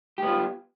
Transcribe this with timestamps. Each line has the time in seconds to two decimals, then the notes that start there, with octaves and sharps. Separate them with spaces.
0.18 G4
0.22 B3
0.27 F4